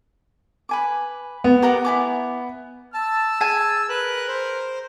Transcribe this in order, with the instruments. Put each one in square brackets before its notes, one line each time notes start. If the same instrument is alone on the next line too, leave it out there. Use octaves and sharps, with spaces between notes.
[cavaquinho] B4 G#5 D6
[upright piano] B3
[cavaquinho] G4 A#4 F#5
E4 G#5 D6
[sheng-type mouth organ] A5 [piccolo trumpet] E6
[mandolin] G#4 G#5 [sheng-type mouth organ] A5
[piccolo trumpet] A#4 [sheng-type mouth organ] B4 F#6
[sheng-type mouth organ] C5